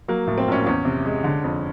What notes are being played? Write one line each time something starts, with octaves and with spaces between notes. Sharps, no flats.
F#3 A#3
A2
C4
A#1 C#4
E2 C#4
C3
G#3
D3
F2